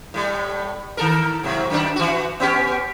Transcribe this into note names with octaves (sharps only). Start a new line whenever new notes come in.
A2 G3
D#3 A4 A#4
G#2 C3 F#3
F#2 D#3 D4
E3 F#4
B3 C#4 G4